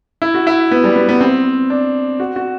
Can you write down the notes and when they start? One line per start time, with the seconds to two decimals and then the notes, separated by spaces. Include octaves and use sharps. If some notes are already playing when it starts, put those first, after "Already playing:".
0.22 E4
0.34 F#4
0.47 E4
0.71 B3
0.84 G3
0.96 B3
1.09 B3
1.21 C4
1.70 D4
2.20 F#4
2.36 F#4